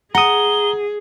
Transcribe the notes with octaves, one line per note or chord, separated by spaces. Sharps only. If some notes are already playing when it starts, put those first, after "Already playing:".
G#4 F#5 A#5 D#6 G7